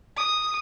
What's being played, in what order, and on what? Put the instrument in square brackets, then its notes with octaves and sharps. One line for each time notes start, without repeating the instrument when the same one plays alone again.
[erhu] D#6